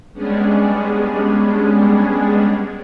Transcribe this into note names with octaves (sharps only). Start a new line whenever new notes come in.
G3 G#3 B3 C#4 D4 G#4